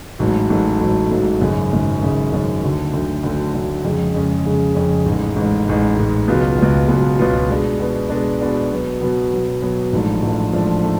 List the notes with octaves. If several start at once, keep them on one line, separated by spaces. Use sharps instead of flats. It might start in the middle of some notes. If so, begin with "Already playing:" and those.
A1 G#2 F#3 A3
A1 G#2 F#3 A3
A1 G#2 F#3 A3
A1 G#2 F#3 A3
G#1 F#2 C#3
G#1 F#2 C#3
G#1 F#2 C#3
G#1 F#2 C#3
D2 D3 F#3
D2 D3 F#3
D2 D3 F#3
D2 D3 F#3
F2 C#3 G#3 C#4
F2 C#3 G#3 C#4
F2 C#3 G#3 C#4
F2 C#3 G#3 C#4
A1 G#2 G#3
A1 G#2 G#3
A1 G#2 G#3
A1 G#2 G#3
C#2 B2 F#3 B3 F4
C#2 B2 F#3 B3 F4
C#2 B2 F#3 B3 F4
C#2 B2 F#3 B3 F4
B2 G#3 B3 D4
B2 G#3 B3 D4
B2 G#3 B3 D4
B2 G#3 B3 D4
B2 F#3 B3
B2 F#3 B3
B2 F#3 B3
B2 F#3 B3
A1 G#2 F3 A3 D4
A1 G#2 F3 A3 D4
A1 G#2 F3 A3 D4
A3 D4